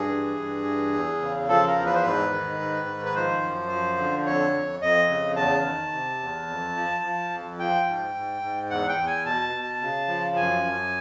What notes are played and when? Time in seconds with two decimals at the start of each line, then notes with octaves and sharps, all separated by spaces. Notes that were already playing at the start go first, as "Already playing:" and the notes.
Already playing: G2 G#4
0.09 E3
0.38 G2
0.65 E3
0.94 E2
1.20 C#3
1.48 F3 A4
1.67 A#4
1.76 E2
1.86 B4
1.94 C5
2.02 G#2 B4
2.31 D#3
2.59 G#2
2.87 D#3
3.06 B4
3.15 F3 C5
3.42 F#2
3.70 F3
3.98 D3
4.26 F2 C#5
4.53 F2
4.81 F2 D#5
5.09 C#3
5.36 E2 A5
5.64 D#3
5.92 C3
6.20 E2
6.48 F2
6.75 F3
7.03 F3
7.30 F2
7.58 F3 G5
7.86 G#2
8.14 G#2
8.42 G#2
8.70 E2 F#5
8.89 G5
8.98 E2
9.07 G#5
9.25 B2 A5
9.53 B2
9.81 C#3
10.08 F3
10.36 F#2 G#5
10.63 F#2